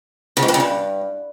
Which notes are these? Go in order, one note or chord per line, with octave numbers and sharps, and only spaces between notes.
C#3
G#2
G2
C#3
G2